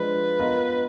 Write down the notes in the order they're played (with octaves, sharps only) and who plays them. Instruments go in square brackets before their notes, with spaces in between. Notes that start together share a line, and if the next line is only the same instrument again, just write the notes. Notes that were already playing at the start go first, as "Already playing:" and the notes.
Already playing: [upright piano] F3 G#3 D4 F4 [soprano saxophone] B4
[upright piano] B3 F4 A#4 D#5